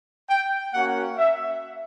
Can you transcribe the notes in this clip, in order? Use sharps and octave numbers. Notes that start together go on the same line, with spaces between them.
G5
A#3 C#4 F#4 F#5
E5